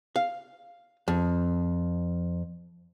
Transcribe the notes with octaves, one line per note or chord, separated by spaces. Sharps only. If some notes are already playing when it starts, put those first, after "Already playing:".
F5
F2